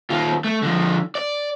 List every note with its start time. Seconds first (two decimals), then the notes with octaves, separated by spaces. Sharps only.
0.10 D#2 F4
0.44 A3
0.63 D3 F3
1.15 D5